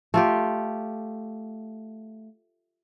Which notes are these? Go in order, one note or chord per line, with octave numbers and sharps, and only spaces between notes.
A3 F4 G4